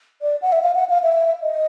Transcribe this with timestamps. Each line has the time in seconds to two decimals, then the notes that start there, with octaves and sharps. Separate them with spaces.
0.21 D5
0.41 F#5
0.52 E5
0.62 F5
0.75 F#5
0.89 F5
1.02 E5
1.42 D#5